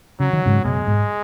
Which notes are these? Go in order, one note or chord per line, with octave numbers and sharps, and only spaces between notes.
C#3 F#3
D#3
G#2 C#3
F#2 B2 G#3
G#2